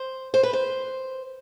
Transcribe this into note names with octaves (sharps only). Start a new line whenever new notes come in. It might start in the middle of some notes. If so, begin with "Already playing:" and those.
Already playing: C5
C5
B4
C5